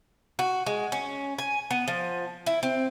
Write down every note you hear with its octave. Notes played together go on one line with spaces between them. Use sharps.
F#4
G#3
C#4
G#5
B3
F3
E4
C4